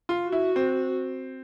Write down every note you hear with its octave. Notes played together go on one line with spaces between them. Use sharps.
F4
F#4
E4
C4